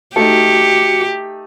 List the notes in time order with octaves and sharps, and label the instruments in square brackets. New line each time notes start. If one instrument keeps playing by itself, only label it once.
[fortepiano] A3 D#4 [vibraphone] F#4 [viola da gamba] G4 [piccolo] C#7